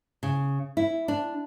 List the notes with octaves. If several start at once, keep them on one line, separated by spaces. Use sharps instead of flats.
C#3
E4
D4